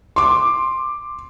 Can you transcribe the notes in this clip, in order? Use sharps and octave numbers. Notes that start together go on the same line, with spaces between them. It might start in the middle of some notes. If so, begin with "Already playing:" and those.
C6 D6